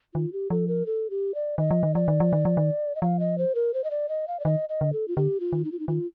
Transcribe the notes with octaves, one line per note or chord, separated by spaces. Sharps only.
D#3 F4
G4
F3 A4
A#4
A4
G4
D5
D#3 D#5
F3
D#3
F3 D5
D#3
F3
D#3
F3
D#3
D#5
F3 F5
D#5
C5
A#4
C5
D#5
D5
D#5
F5
D5
D#3 D#5
D#5
D3
A4
F4
D3 G4
F4
D#3
D#4
F4
D#4
D#3 F4